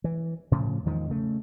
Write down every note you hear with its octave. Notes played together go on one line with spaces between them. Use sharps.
E3
A2 C#3 F3
E2 D#3 F3 G#3
C#3 A3